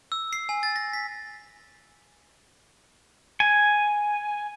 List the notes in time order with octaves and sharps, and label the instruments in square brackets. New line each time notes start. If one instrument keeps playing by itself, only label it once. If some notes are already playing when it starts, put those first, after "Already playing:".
[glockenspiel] E6
C7
G#5
A6
A#6
B6
[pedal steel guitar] G#5